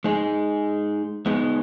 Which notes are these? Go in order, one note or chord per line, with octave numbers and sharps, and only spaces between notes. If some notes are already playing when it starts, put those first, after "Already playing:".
G#3 D#4 G#4
G#3 B3 D#4